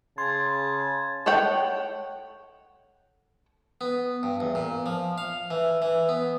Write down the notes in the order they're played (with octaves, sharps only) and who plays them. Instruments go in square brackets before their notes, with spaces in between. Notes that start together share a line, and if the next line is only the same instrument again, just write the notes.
[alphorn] C#3 [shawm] A5 [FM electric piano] C6 [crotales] G#6
[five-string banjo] A4 C#5 F#5 G5
[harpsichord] B3
G2
E2
A#2
F3
F5
E3
E3
B3